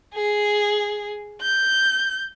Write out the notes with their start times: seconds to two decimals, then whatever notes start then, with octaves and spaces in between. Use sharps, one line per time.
0.15 G#4
1.42 G6